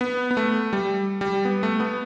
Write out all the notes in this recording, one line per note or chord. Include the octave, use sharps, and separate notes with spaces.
B3
B3
A3
G3
G3
B3
A3
B3